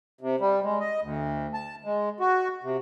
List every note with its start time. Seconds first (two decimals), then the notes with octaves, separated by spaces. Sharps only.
0.21 C3
0.40 G3
0.63 G#3
0.80 D#5
1.02 D2
1.54 A5
1.84 G#3
2.20 F#4
2.63 C3